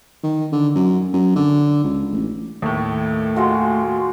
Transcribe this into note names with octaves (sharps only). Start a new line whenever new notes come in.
D#3
D3
F#2
F#2
D3
C#2
A1
D#2 A2 A3
G#3 F4 F#4